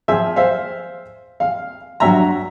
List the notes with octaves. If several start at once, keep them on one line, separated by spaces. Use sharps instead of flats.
F3 G#4 E5
C5 E5 F5
F5
G2 F#3 E5 A#5